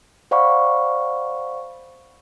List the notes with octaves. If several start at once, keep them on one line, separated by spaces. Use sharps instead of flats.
C5 D5 F5 F#5 B5 C#6